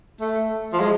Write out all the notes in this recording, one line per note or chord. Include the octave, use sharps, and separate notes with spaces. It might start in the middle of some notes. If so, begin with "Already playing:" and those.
A3
F3
G#3